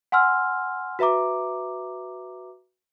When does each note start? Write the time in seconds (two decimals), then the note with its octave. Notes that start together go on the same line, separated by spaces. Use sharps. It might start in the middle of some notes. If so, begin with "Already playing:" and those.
0.12 F#5 G#5 C6 E6 F6
0.99 F#4 B4 E5 A#5 D6